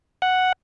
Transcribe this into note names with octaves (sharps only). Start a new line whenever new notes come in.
F#5